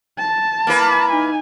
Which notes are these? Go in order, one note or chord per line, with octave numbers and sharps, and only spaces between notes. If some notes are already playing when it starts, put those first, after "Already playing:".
A5
A#3 E4 B4
D#4 G#5